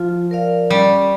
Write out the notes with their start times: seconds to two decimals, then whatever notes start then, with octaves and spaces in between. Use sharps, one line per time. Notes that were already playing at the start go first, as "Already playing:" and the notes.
Already playing: F3 F4
0.31 A#4 D5 F5
0.70 G3 C#4